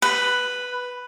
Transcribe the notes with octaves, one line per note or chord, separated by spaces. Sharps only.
B4